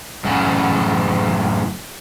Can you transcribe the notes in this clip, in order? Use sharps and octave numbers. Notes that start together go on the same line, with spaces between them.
F#2 A2 C#3